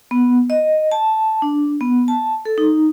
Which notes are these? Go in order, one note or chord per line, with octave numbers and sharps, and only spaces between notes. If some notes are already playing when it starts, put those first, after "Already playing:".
B3
D#5
A5
D4
B3
A5
A4
D#4